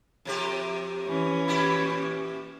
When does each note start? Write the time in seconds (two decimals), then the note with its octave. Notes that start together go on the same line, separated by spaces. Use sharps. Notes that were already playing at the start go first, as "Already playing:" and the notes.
0.25 F2 C3 G4
1.07 E3 C#4
1.47 A#2 E4 G4